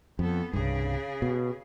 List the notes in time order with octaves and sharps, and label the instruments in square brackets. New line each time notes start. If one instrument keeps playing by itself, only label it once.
[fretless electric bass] F2 [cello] B3 A4
[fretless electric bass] C2 G2 [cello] C#3 G#4
[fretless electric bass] B2